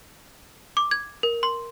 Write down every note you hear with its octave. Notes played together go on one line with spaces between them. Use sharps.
D6
G#6
A#4
C6